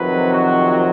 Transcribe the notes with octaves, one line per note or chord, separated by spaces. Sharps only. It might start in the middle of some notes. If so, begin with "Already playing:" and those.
Already playing: F2 C3 D#3 F#3 B4
F#4